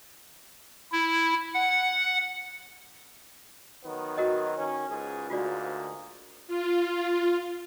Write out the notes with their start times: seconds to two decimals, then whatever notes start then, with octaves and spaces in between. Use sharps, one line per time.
0.92 E4
1.54 F#5
3.83 D#3 F#3 B3
4.17 F#4 A#4 D#5
4.57 D#3 C#4
4.88 C#2 G#2 G#4
5.30 D2 G#2 A#3 F4 F#4 D5
6.47 F4